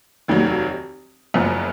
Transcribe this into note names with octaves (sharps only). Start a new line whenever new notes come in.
F1 D#2 D#3 F#3
F#1 F#2 F3 B3